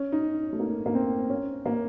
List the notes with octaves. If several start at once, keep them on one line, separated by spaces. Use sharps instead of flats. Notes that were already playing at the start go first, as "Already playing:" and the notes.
Already playing: C#4
D#4
A3
A#3
A#3
C4
C#4
A#3